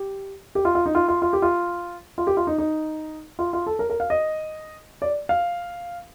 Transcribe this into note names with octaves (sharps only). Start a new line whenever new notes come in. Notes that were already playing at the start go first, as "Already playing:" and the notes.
Already playing: G4
G4
F4
F4
D#4
F4
F4
F4
G4
F4
F4
G4
F4
D#4
D#4
F4
F4
A4
A#4
A#4
F5
D#5
D5
F5